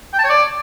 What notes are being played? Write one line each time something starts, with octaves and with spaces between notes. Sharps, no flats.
G5
A5
C#5
D5